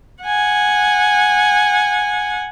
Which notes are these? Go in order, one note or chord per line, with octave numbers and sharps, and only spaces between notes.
F#5 G#5